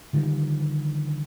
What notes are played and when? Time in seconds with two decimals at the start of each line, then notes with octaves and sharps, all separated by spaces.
0.13 D3 D#3 F3 G3